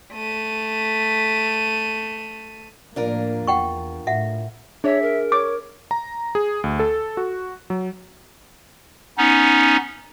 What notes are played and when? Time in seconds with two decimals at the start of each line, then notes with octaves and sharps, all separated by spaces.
0.13 A3 D#7
2.96 A2 F3 A#3 D4 F4 A#4
3.47 E2 F#5 G5 C#6
4.07 A2 E5 F#5
4.84 D4 G#4 C#5 E5
5.02 A#4
5.32 C#5 D6
5.91 A#5
6.35 G#4
6.64 D2
6.80 A4
7.17 F#4
7.70 F#3
9.18 B3 C#4 D#4